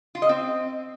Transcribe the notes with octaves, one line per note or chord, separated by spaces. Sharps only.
F4
D#5
C4